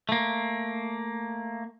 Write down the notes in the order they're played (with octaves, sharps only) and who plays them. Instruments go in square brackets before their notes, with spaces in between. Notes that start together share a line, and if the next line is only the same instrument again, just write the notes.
[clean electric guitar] A3 A#3